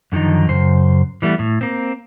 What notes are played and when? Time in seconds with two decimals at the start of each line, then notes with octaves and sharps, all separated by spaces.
0.12 F#2 D3 D#3 F3 D#4
0.49 F#2 C#3 C5
1.22 E3 G3 A3 B3
1.39 A2
1.61 A#3 C4